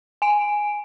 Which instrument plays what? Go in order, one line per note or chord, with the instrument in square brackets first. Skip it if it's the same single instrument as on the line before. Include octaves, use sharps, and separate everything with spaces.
[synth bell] G#5 D7